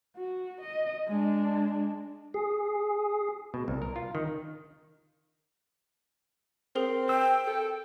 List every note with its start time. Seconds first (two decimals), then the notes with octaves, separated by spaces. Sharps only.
0.17 F#4
0.61 D#5
1.08 G#3 D4
2.34 G#4
3.54 B2
3.68 C2
3.82 A#4
3.96 F4
4.15 D#3
6.76 C4 G#4 A#4
7.09 G5 E6
7.47 A4